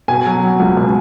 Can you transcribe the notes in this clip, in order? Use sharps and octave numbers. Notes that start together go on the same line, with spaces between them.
B2 G#5
F#3
F#3
C#2
B2